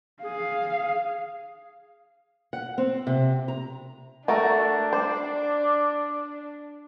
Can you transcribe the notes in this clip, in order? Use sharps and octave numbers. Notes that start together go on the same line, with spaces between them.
G#4 F5
F#5
C4
C3
A#5
A3 D4 F#4 A#4 A5
C5 D5